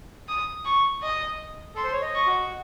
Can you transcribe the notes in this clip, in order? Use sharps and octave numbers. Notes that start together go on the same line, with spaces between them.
D#6
C#6
D#5
A4 C6
C5
C#5
D#5
C#6
F#4